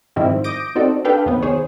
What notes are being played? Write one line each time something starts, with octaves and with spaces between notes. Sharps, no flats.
G#2 D#3 F3 G3 C4 E4
D6 D#6 G6 A#6 D7
C4 D#4 F#4 A4 D5
D4 G4 A4 B4 F5 G5
D#2 C3 F#3 B3
D#2 G#4 C5 C#5